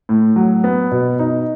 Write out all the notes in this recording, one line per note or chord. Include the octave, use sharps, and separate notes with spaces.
A2
F#3
B3
B2
D#4